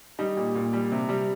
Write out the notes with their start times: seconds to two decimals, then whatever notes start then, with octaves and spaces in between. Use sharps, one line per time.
0.19 G3 D#4
0.37 A#2
0.55 A#2
0.73 G3
0.92 C3
1.09 G3